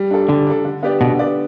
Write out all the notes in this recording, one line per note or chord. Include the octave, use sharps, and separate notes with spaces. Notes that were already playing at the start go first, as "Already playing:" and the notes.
Already playing: G3
D4 A4
D3 G3
D4 A4
D3
B3 G4 D5
B2 D3
B3 G4 D5